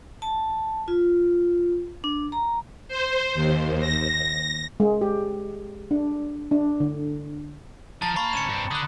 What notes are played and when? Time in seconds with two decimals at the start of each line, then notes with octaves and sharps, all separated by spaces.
0.22 A5
0.88 F4
2.04 D4
2.32 A#5
2.88 C5
3.34 D#2
3.80 A#6
4.80 G#3
5.01 G4
5.91 D4
6.51 D4
6.80 D3
8.02 F3 A5 A#5 A6
8.16 A#3 F5 A5 B5 C#6
8.33 D2 C#4 C#7 E7
8.49 G2 C4
8.71 D3 D#6 F#6